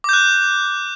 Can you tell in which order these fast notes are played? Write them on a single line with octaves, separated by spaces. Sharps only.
D6 G6 F#6